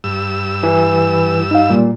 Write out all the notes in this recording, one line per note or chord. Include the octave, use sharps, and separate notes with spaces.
G2 E6
E3
D#4 F5
A#2 G3